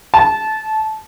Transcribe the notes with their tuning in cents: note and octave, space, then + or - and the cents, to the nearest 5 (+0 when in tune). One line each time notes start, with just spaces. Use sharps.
A5 -20